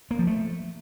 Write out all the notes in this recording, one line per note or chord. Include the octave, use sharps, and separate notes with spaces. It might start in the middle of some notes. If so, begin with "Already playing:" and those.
A#3
F3
A3